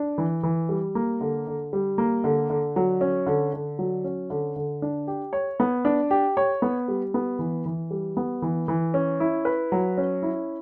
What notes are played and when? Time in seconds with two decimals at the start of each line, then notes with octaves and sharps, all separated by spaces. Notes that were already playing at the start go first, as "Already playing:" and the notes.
Already playing: D4
0.18 E3
0.43 E3
0.69 G3
0.95 A#3
1.21 D3
1.47 D3
1.73 G3
1.98 A#3
2.24 D3
2.50 D3
2.76 F#3
3.01 C#4
3.27 D3
3.53 D3
3.79 F#3
4.04 C#4
4.30 D3
4.56 D3
4.82 D4
5.08 G4
5.33 C#5
5.60 B3
5.85 D4
6.11 G4
6.37 C#5
6.62 B3
6.88 G3
7.14 B3
7.39 E3
7.66 E3
7.91 G3
8.17 B3
8.42 E3
8.68 E3
8.94 C#4
9.20 E4
9.45 B4
9.72 F#3
9.98 C#4
10.23 E4